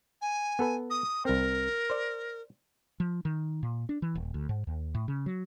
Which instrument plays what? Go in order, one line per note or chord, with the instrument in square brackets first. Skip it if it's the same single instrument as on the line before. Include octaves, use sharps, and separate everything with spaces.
[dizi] G#5
[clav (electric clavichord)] B3 A4 B4
[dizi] D#6
[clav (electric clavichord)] C2 C4 [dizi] A#4
[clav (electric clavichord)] C5 D5
[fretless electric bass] F3
D#3
A#2
D4
E3
D#1
D2
G#2
D#2
A2
C#3
F#3